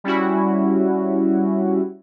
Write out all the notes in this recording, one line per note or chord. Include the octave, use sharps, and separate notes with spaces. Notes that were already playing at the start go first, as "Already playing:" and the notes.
G3 C#4 E4 F#4